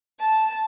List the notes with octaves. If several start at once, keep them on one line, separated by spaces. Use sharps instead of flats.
A5